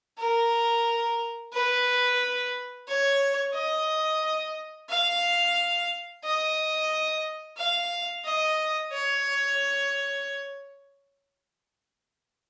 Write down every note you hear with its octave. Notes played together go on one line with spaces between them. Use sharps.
A#4
B4
C#5
D#5
F5
D#5
F5
D#5
C#5